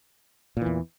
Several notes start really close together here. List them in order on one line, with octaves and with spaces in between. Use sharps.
A#2 E3 E2